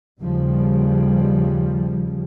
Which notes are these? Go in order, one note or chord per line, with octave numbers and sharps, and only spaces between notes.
D#2 C#3 F3 G3